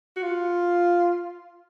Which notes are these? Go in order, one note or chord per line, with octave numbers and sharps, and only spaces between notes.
F#4
F4